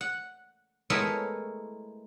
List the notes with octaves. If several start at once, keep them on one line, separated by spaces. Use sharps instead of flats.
F#5
G#3 A3 B3 E4 A#4 C#5